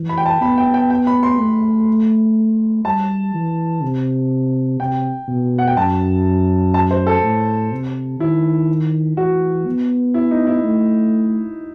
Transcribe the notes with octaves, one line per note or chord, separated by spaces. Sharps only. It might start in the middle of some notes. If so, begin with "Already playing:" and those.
Already playing: E3
B5
G5
A5
B3 B5
G5
G5
G5
B5
C6
A3
G3 A5
E3
C3
C3 G5
B2
F#5
G5
F#2 A5
A5
C5
A4
A2
C3
D#3 E4
E3 F#4
B3
E4
D#4
E4
A3